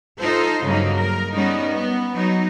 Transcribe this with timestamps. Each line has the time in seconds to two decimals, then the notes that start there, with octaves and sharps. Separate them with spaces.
0.19 D#4 F4 A4 C5
0.65 G2 C#3 F#3 A#3 D#4
0.96 A#4
1.35 G3 B3 C#4 D#4
1.70 B3
2.14 F#3 D#4